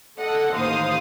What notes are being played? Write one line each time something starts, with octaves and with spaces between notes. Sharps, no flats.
A4 D#5 F#5
A1 D#2 C5 F5 D#6